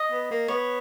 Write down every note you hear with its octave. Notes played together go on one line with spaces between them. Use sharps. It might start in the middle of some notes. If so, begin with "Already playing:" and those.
Already playing: D#5
B3
A#3
B3 C#5